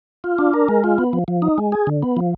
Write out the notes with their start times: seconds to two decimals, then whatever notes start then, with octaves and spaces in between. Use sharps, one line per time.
0.24 F4
0.38 D4
0.54 A#4
0.68 G#3
0.84 F4
0.98 B3
1.13 F3
1.28 F3
1.42 D#4
1.58 G#3
1.72 G#4
1.87 D3
2.03 B3
2.17 F3